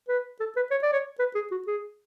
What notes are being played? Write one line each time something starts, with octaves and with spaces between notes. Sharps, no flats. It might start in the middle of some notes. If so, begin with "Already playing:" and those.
B4
A4
B4
C#5
D5
C#5
B4
G#4
F#4
G#4